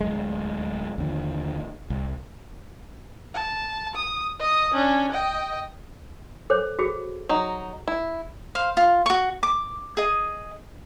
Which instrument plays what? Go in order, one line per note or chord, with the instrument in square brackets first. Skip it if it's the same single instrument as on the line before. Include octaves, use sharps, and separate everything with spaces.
[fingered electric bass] D1 E2 G#3
D#2 D3 F3
C2
[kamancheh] A5
D#6
D#5 D#6
C#4 D4
D#5 G5
[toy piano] A4 C5 C#5
F#4 G#4
[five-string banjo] F#3 D#4
E4
[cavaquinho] C5 F5
F4
F#4 C#6
D6
G#4 D#5